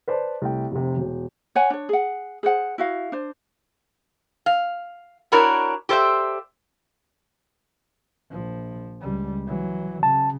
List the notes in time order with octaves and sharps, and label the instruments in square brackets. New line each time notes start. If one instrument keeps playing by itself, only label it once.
[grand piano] B4 C5 D5 A5
C2 A3 G5
F1 C3
E1
[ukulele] C#5 F#5 G#5
D4 C#5
G#4 F#5
G#4 C5 F#5
E4 F#4 F5
D4 C5
[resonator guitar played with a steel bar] F5
D4 E4 F#4 A#4 C#5 D5
G4 A4 C5 D5 E5
[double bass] A#1 F3
C#2 G3
E3 F#3
[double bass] C#3 [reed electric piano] A5